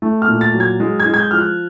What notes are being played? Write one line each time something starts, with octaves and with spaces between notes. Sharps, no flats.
A3
F6
A#2
A6
F#3
G#6
G#3
G#6
G#3
G#6
G6
F3 F6
F#6